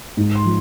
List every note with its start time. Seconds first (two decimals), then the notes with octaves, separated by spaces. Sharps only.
0.17 G#2
0.35 C6
0.45 F3